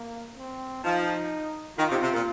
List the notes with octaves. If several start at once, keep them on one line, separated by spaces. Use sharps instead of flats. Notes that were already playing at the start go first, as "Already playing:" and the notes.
Already playing: A#3
C4
F3 D#4
D#3 F4
C3
C3
A#2